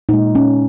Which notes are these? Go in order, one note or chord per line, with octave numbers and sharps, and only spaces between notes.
A#2 G#3 D#4
C#4